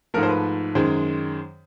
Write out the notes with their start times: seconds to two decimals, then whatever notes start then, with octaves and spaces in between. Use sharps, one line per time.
0.14 G#2 F3 A3 A#4
0.23 C5
0.29 B4
0.75 F#2 D#3 G#3 C5